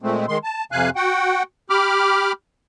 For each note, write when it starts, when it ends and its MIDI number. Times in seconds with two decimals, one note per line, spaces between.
0.02 0.26 46
0.02 0.26 56
0.02 0.26 57
0.02 0.26 60
0.28 0.38 51
0.28 0.38 56
0.28 0.38 84
0.44 0.64 81
0.72 0.90 41
0.72 0.90 48
0.72 0.90 77
0.72 0.90 80
0.72 0.90 90
0.96 1.43 66
0.96 1.43 78
0.96 1.43 79
1.70 2.32 67
1.70 2.32 83
1.70 2.32 86
1.70 2.32 89